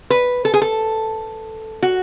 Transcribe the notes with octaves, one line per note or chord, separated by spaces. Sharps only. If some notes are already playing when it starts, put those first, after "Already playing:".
B4
A4
G#4
A4
F#4